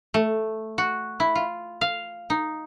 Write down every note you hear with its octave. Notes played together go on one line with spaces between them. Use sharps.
A3
F#4
E4
F4
F5
D#4